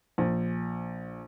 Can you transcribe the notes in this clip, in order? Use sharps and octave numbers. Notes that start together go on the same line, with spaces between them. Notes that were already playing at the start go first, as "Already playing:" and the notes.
A#1